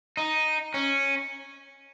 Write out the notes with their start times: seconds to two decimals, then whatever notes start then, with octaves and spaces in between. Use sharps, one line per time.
0.17 D#4
0.74 C#4